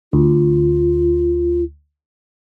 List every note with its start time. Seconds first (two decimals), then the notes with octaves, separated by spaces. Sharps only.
0.13 D2 F4